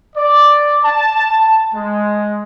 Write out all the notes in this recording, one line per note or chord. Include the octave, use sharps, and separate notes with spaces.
D5
A5
G#3